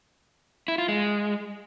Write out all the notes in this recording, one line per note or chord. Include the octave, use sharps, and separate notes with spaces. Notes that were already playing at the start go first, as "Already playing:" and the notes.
E4
F4
G#3